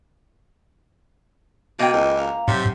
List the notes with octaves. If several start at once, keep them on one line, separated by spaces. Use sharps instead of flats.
B2 A#3 D#5 G5
C#2 D#5
F5 A#5
G#2 C3 F#3 C#5